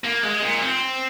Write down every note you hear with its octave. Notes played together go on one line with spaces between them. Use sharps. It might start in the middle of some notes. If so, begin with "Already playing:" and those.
A#3
G#3
A#2
C4